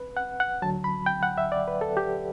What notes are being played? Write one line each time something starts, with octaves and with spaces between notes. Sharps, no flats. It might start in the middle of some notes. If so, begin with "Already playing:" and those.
Already playing: B4
F#5
F#5
D2 D3 F#3 A5
B5
G5
F#5
E5
D5
B4
A4
G4